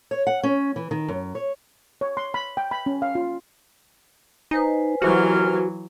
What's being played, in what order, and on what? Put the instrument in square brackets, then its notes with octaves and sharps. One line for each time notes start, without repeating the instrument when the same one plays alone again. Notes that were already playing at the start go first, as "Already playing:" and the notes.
[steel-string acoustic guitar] C#5
F#5
C#4
E3
D#3
F#2
C#5
[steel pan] C#5
C6
B5
G5
B5
C#4
F5
F4
[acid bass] D#4 [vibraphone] B4 C5 G#5
[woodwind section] D#2 C3 F6 [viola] E3 F#3 [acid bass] F#4